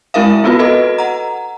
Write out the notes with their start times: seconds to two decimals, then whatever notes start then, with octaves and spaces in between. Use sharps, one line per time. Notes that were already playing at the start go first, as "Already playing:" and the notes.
0.14 G#3 C4 E4 A#4 E5 F5
0.44 B3 C4 F4 F#4 B4
0.59 F#4 A4 B4 D#5
0.98 F#5 A#5